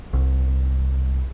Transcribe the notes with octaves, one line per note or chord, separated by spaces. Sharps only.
C2